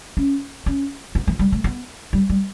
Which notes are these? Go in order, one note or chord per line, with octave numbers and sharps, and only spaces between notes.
C#4
C#4
B3
E3
G3
A3
B3
G3
G3